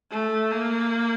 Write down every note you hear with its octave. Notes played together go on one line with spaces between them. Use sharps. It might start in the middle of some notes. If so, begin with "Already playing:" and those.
A3
A#3